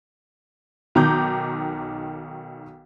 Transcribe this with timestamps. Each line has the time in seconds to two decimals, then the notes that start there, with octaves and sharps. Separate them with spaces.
0.95 B1 D#3 A#5 D6 G6